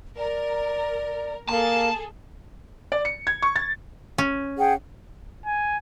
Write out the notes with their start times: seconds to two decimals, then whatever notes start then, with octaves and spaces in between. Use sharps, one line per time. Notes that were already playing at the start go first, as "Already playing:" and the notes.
0.18 A#4 D5
1.49 A#3 G#4 A4 A5
2.92 D5
3.05 C#7
3.27 G#6
3.42 C#6
3.56 A6
4.18 C#4
4.58 G#4 F#5 G5
5.46 G#5